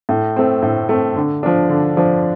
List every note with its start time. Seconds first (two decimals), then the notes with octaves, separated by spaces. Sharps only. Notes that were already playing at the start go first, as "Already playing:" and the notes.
0.09 A2
0.37 A3 C4
0.62 A2
0.89 A3 C4
1.16 D3
1.43 F3 D4
1.69 D3
1.97 F3 D4